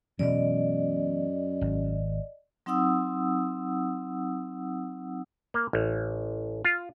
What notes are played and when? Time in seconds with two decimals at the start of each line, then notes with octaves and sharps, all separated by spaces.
0.19 F#2 B2 E3 G#3 D5 D#5
1.61 G#1
2.66 F#3 C4 D#4 F#5 D#6 E6
5.54 A#3
5.73 A1
6.65 F4